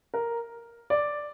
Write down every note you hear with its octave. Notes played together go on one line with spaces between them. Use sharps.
A#4
D5